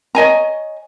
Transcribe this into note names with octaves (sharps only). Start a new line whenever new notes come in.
C#5 D#5 G#5 A#5